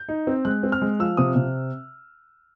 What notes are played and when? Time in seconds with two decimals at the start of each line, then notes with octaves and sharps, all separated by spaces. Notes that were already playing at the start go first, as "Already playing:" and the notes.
Already playing: G6
0.09 D#4
0.27 C4
0.45 G#3 F#6
0.63 C4
0.72 F6
0.82 G#3
0.99 F3 E6
1.17 C3 D#6
1.36 C3